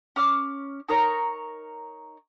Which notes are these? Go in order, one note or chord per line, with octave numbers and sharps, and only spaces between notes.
C#4 D6 F6
D#4 A#4 C#5 A#5